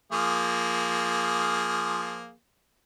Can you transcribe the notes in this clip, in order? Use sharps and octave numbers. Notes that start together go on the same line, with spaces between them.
F3 A#3 G#4